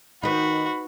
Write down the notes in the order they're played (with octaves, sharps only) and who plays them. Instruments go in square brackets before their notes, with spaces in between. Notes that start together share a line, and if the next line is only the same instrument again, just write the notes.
[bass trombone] D#3 [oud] D#4 B4 [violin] F#4 [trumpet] B5